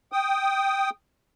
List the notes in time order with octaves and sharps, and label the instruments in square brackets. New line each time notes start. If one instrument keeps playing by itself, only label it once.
[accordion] G5 D#6